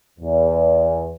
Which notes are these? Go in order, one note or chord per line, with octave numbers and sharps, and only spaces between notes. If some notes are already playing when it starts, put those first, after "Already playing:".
E2